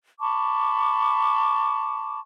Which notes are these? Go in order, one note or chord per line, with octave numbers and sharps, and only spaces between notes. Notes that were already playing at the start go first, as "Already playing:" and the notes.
A5 B5 C#6 D6